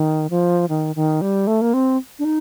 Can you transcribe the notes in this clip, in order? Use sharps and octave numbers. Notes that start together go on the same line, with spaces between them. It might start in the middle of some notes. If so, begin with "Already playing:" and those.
Already playing: D#3
F3
D#3
D#3
G3
A3
A#3
C4
D4
D#4